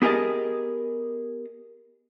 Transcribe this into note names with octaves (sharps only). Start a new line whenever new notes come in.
B3 G4 G#4 A#4 D#5 A5